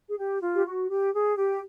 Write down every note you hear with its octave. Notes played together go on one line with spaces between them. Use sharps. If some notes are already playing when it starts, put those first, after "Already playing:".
G#4
G4
F4
G4
F#4
G4
G#4
G4